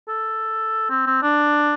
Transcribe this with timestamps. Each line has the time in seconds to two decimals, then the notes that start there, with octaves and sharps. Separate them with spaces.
0.08 A4
0.90 C4
1.07 C4
1.23 D4